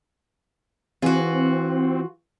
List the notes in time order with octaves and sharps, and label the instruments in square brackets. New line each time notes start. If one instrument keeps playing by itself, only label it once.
[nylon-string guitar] E3 G#4 [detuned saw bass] C4 [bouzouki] F4 F#4